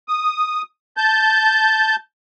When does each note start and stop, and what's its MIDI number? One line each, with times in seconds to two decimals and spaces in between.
0.08 0.62 87
0.97 1.96 81
0.97 1.96 91